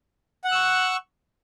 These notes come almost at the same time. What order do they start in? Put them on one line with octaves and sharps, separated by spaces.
F#5 F#6 E6 C#6